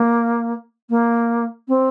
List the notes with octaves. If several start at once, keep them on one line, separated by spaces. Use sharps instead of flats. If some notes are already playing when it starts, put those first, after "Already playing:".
Already playing: A#3
A#3
C4